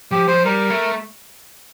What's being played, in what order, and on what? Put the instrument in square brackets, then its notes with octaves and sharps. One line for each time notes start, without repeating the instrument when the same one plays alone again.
[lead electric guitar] F3 [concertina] G4
[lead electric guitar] F3 [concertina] C5
[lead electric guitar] G3 [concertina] A#4
[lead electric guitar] A3